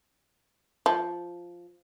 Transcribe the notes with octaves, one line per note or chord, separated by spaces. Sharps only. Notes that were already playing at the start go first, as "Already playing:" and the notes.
F3